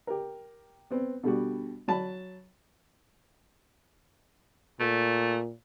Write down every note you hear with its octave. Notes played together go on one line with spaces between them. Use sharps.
G4 A#4
B3 C4
B2 D3 G3 F#4
F#3 A5 B5
A#2 A3